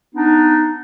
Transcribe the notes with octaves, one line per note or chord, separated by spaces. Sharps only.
B3 D4 D#4